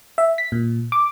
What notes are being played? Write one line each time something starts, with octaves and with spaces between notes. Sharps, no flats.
E5
B6
A#2
D6